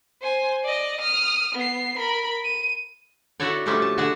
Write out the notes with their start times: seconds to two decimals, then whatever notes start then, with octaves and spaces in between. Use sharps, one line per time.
0.21 C5 G#5
0.63 D5 D#5
1.01 D#6 F6
1.55 B3 C7
1.98 A#4 B5
2.44 D#7
3.40 E4 F#4 A4 C#5 D5
3.66 B2 D3 F3 G3 A3 C#4
3.82 A5
3.98 D3 F#4 G#4 A5